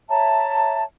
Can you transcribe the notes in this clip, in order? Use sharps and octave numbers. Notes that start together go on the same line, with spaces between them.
C#5 E5 A5 A#5